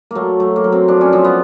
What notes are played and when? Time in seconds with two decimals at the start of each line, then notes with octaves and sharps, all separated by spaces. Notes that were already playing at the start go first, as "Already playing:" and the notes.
0.11 F#3 A3 A#3
0.40 F#3 A3
0.56 A#3
0.64 F#3
0.72 C4
0.88 F3 D4
1.01 C#4
1.13 F3 C4
1.24 B3